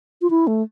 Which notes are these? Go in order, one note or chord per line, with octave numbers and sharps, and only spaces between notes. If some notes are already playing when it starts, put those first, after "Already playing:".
F4
E4
A3